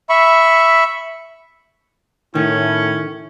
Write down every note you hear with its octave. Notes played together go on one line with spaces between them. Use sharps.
E5 B5 C#6
A2 D#3 C#4 E4